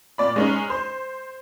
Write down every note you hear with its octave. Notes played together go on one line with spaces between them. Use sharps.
A#2 D5 B5
G#3 C#4 D#4
C5